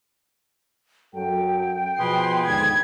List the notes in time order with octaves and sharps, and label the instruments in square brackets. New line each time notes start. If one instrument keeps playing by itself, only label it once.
[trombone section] F#2 F#3 A4 [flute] G5
[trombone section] B2 F3 [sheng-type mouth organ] G#4 B4 [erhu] C6
[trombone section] D#2 G#2 D3 [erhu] G#6